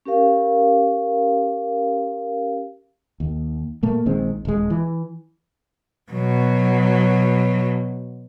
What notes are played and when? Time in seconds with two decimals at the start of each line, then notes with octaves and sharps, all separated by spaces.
0.06 C#4 G4 A#4 F5
3.20 D#2
3.83 A#2 A3 A#3
4.06 A#1 D#3 G#3 C4
4.45 D#1 G#3
4.70 E3
6.12 B2 F#3